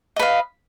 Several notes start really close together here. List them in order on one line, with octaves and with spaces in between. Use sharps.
D#5 B4 F5